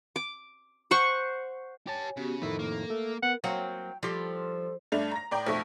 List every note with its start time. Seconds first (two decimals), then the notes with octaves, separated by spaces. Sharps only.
0.16 D6
0.91 C5 F#5 C#6
1.88 G4 C#5 G#5 A5
2.17 C#3 B3 F#4 G4
2.42 F2 A2 D#3 A4 B4 E5
2.59 A#3
2.90 A3
3.23 B3 A#4 F#5
3.44 F#3 A#3 C4 F#5 G5
4.03 F3 G3 G4 A4
4.92 G2 A3 D4 F7
5.11 A#5 A#6
5.31 A2 D5 G5 A#5
5.47 B1 F2 A3 C#6